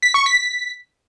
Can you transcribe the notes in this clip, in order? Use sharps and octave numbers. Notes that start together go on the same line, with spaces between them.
B6
C#6
B6